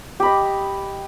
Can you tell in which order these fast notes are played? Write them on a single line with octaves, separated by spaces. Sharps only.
G4 B5 D#5